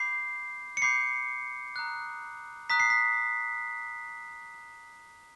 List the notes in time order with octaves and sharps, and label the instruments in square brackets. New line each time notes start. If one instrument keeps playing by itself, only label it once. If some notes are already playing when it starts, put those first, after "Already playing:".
Already playing: [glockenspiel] B5 D6 G6 C7
C#7
B5 D6 G6 C7
A#5 D#6 F#6
A#5 D#6 F#6 B6
C7
B6